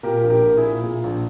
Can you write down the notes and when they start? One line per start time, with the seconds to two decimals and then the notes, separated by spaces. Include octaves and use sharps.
0.03 A#2 G4 A#4
0.23 A#1
0.30 G4 A#4
0.43 A#1
0.57 E4 G#4
0.63 A#2
0.83 A#2
1.04 A#1